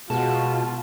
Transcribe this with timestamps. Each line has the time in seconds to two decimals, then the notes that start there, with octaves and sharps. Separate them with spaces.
0.10 B2 G#3 F4 F#4 A5